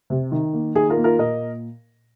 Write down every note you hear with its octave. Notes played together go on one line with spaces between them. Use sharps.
C3
D#3
A#3
D#3 G#4
F4 A#4
A#3
F4 A#4
A#2 A#4 D#5